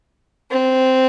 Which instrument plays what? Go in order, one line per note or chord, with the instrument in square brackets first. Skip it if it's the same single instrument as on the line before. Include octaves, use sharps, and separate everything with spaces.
[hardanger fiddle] C4